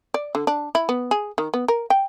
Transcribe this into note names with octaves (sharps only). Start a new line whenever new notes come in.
D5
D3
D4
E4
B3
G#4
D#3
B3
A#4
G5